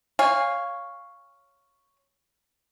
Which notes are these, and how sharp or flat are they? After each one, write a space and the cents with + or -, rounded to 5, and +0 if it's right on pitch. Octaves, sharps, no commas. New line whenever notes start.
C#5 +0 F5 +0 G#5 -25